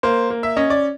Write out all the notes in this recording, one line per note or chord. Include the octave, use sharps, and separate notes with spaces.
A#3 C5
A#3
E5
C#4 D#5
D5